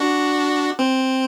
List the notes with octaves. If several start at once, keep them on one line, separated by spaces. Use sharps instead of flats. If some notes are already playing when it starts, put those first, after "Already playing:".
Already playing: D4 F#4
C4